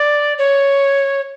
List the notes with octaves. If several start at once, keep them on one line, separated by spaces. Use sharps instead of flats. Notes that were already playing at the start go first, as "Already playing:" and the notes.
Already playing: D5
C#5